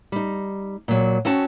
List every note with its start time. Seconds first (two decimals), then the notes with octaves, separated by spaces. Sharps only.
0.12 G3 D#4
0.88 A#2 F#3
1.25 C4 C#4 F#4 A5